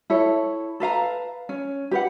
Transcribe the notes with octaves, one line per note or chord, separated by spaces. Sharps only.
E4 A4 C#5
A4 B4 F5 A#5
C#4
G4 B4 F#5